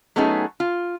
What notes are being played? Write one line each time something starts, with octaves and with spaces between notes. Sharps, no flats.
F#3 A3 B3 C#4 D#4 G#4
F4